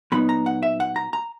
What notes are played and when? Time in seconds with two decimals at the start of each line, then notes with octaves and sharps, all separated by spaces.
0.12 A#2 F#3 B3 D#4 B5
0.29 A#5
0.46 F#5
0.63 E5
0.80 F#5
0.96 A#5
1.13 A#5